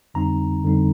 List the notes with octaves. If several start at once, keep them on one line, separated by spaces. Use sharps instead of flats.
F2 D3 G3 C4 D#4 A#5
F2 D3 G3 C4 D#4